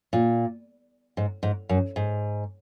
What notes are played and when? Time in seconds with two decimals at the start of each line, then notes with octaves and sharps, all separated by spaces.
0.13 A#2
1.17 G#2
1.43 G#2
1.69 F#2
1.96 G#2